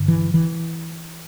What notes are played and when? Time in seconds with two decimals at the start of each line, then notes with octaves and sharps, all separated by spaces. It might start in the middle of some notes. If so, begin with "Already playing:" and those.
Already playing: G2 D3
0.08 E3
0.34 E3